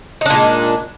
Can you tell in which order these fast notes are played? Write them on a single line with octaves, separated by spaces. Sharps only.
D#4 D4 A#2 G#3